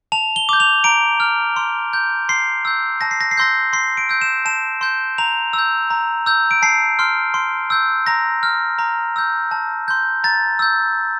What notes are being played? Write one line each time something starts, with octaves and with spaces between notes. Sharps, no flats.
A5 F7
G7
D6 G6
F7
A#5 D7
F6
C6
G6
C6 C7
E6 G6
A5 A#6
C7
A#6
C7
C6 E6 G6 A#6
C6 C7
D7
E6 G6
E7
A5 E7
C6 G6
A#5 F7
E6
G6
A#5
E6 G6
D7
A5 C7
C6 F6
C6
E6 G6
A#5 A#6
F6
A#5
E6 G6
A5
C6 G6
A#5 A6
E6 G6